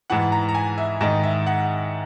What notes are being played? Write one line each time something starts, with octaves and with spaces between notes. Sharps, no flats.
G#2 E3 F#5
A#5
A#5
G#5
E5
G#2 D#3 D#5
E5
F#5